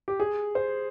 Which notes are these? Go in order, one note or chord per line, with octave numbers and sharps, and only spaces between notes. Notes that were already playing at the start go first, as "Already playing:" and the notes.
G4
G#4
C5